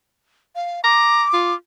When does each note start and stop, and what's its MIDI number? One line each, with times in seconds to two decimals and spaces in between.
0.56 0.83 77
0.84 1.23 82
0.84 1.55 86
1.33 1.53 65